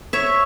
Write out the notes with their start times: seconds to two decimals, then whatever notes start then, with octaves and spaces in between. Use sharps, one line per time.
0.13 C#5 E5